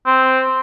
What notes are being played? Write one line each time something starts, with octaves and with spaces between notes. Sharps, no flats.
C4